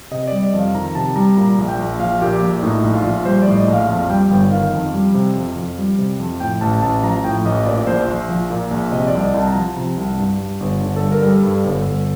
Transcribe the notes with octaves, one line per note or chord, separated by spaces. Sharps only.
C3 D#5
G3 D5
D#5
F2
F5
D#3 A#5
C3 A5
G3 A#5
A#2 A#5
A#1
G5
A#1
F3 F5
A#2 G4
A#1
A2 D#4
A#1
F4
A#1
G3 C5
D5
A2
D#5
A#1
F5
F2 F5
G3 G5
G1 G5
D#3 F5
F2
G3
C3
F2
F2
G3
C3
F2
A2 G5
A1 A5
A1 A5
F3 A#5
A2 G5
A1 D#5
A#2 D5
A#1 C5
A#1
F3
A#2
A#1
C3 D#5
D5
C2
D#5
C2
A5
A#5
F3 A5
C3
C2
G2
G3
G1
D3
A4
G2
A#4
G3
A4
G2
G1
G1